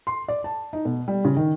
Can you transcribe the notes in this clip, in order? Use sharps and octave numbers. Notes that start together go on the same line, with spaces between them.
C6
D5
A5
D#4
B2
G3
C#3
D#3